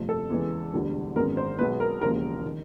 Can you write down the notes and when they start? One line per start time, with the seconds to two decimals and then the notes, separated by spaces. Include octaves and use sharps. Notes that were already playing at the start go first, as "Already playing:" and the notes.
Already playing: G1 F2 C3 F3 A3
0.09 A4
0.30 E2 C#3 E3 G#3 B3
0.73 E1 D2 D3 G3
1.16 G#1 F#2 D#3 G#3 B3 A#4
1.37 C5
1.58 B1 B2 G#3 B3 B4
1.80 A#4
2.01 E1 D#2 C#3 F3 A#3 A#4
2.46 D#3